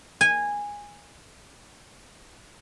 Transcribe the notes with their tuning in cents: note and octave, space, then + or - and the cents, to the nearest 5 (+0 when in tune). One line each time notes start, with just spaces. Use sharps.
G#5 -15